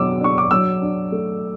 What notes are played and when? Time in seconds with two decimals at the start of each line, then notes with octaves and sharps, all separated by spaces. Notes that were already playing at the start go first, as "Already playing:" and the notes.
Already playing: B2 F#3 D6 E6
0.20 D4 C#6
0.38 D6
0.51 F#3 E6
0.82 D4
1.12 A3